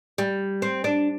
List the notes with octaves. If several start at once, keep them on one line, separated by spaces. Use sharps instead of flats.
G3
C4
D4